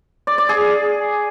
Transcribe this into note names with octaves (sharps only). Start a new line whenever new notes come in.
D5
D5
G#4